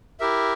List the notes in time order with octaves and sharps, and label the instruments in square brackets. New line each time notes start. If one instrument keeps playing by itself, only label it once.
[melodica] E4 G4 A#4 E5